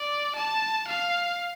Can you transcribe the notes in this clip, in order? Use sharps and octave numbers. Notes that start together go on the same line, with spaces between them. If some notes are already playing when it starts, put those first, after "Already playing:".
Already playing: D5
A5
F5